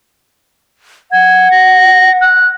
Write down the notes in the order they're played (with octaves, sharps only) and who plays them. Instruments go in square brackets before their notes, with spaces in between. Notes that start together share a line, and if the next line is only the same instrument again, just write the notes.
[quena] F#5 [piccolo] G#6
[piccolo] A#6
F#6